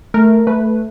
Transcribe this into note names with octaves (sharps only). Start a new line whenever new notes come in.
A3 A#4
A3 B4